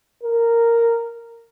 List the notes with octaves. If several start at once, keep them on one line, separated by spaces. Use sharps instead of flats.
A#4